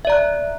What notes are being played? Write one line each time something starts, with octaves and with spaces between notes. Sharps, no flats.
D5 E5 A#5 F#6